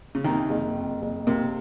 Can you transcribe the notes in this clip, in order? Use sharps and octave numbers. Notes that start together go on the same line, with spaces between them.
C#3
D#2 C3 D#3
F#1
F2
F#1
C3 A#3